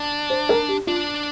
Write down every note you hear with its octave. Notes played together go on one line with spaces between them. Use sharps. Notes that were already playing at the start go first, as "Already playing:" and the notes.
Already playing: D4
C5
A#4
G4
D4 F4